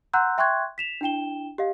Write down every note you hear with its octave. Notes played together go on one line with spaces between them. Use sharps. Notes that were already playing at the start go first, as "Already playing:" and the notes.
F#5 A#5 C6 E6 F#6 G6
E5 G5 C6 C#6 F#6 G#6
B6 E7 F7
D4 E4 G5 E7 G7
G4 D#5 F5